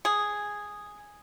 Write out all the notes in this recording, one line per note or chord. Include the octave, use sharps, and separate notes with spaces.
G#4